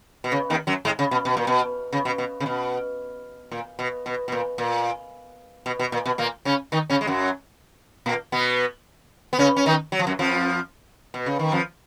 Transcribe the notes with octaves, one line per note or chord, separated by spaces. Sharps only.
B2
C#3
D#2 D#3
F#2 F#3
G#2 G#3
C#3
B2
B2
A#2
B2
C#3
B2
B2
C#3
B2
A#2
B2
B2
B2
A#2
A#2
B2
B2
A#2
B2
A#2 A#3
C#3 C#4
D#3 D#4
C#3 C#4
G#3
F#2 F#3
A#2 A#3
B2 B3
B3
C#3 C#4
C#4
D#3 D#4
F#3
F3
F#2 F#3
F2 F3
B2
C#3
D#3
F2 F3